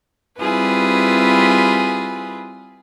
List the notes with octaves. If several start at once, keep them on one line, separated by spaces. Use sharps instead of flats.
G3 C4 E4 F4 G#4 B4